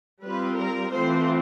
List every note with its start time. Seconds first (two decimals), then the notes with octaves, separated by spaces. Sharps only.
0.21 G3 C4 F4 B4
0.56 A#4
0.91 E3 A3 C4 F4 C5